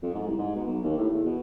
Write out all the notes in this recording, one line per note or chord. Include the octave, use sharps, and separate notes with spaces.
F2
G#2
C2
G#2
B2
B1
D#2
A2
E2
B2